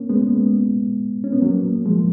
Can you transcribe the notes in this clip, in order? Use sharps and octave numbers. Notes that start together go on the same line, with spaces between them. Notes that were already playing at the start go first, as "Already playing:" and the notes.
Already playing: A#3 C#4
G#3 B3
C#4
B3
F#3 A#3
F3 G#3